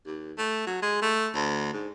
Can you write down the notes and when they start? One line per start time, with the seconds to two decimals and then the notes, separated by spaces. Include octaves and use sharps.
0.06 D#2
0.38 A3
0.67 F#3
0.83 G#3
1.02 A3
1.35 D2
1.73 G#2